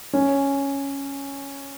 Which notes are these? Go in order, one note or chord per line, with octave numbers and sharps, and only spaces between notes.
C#4